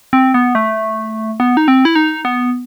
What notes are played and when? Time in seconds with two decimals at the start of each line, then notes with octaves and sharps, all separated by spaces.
0.13 C4
0.34 B3
0.55 A3
1.40 B3
1.57 D#4
1.68 C4
1.85 E4
1.95 D#4
2.25 B3